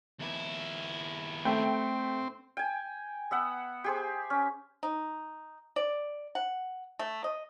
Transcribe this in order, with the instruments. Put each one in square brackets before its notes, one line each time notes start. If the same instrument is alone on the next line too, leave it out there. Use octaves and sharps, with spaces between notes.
[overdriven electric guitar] D#2 E4
[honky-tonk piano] A3 G5 [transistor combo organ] C4
[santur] G5 G#5
B3 E5 F#5
G4 G#4 C5
C#4
[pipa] D#4
D5
F#5
A3
D#5